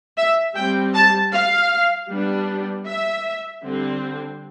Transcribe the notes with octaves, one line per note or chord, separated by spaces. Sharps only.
E5
G3 C4 G5
A5
F5
G3 B3 D4
E5
D3 G3 C4